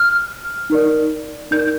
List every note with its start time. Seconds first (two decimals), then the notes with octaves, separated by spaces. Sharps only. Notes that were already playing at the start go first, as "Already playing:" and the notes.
Already playing: F6
0.70 D#4 A#4 D5
1.51 D#4 A#4 D5 G6